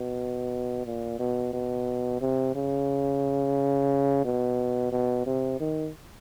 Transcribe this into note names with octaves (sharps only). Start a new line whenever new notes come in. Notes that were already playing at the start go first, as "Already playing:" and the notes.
Already playing: B2
A#2
B2
B2
C3
C#3
B2
B2
C3
D#3